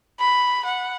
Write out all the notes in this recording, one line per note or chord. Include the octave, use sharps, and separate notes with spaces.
B5
F#5